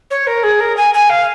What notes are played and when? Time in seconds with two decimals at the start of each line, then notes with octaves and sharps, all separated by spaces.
0.10 C#5
0.27 A#4
0.43 G#4
0.60 A#4
0.77 G#5
0.94 G#5
1.09 F5